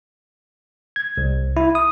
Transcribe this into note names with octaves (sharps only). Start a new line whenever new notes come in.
G#6
C2
E4
D#6